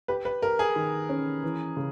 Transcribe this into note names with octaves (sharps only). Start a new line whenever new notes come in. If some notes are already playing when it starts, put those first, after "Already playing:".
G4 B4
B4
G4 A#4
G#4
D#3
C#4
E3
C#3